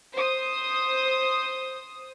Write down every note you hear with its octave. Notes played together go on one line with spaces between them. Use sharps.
C5 D#6